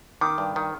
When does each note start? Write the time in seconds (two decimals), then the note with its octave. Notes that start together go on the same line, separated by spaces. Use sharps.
0.21 D#3 D6
0.38 G2
0.56 D#3